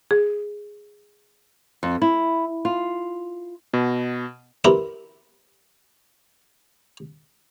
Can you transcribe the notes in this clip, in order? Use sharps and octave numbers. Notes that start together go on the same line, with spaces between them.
G#4
F2
E4
F4
B2
C4 E4 G4 A#4 B4 B5